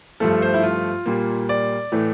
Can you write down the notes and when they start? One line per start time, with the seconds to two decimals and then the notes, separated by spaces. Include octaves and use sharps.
0.20 G2 F3 A3 A4
0.42 C5
0.54 E4
0.63 F4
1.06 A#2 G3 A#3
1.49 D5
1.92 A2 E3 A3